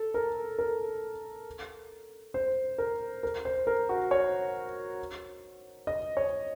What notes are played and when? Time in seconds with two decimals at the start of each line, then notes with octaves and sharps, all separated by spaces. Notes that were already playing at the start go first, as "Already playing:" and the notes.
Already playing: A4
0.14 A#4
0.59 A#4
2.34 C5
2.78 A#4
3.23 A#4
3.45 C5
3.67 A#4
3.89 F#4
4.11 C#5
5.87 D#5
6.17 C#5